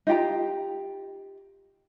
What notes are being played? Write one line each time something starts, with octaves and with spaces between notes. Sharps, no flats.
D#4 F4 G4 A#5